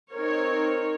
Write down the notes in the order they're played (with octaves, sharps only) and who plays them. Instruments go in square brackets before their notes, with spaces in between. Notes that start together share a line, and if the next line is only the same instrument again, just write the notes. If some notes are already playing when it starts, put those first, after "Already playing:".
[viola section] C4 D#4 A#4 C#5